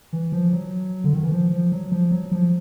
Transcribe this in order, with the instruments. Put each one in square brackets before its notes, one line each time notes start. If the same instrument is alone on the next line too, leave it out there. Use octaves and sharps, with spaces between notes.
[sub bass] E3
F3
F#3
D3
D#3
E3
F3
F3
F#3
F3
F#3
F3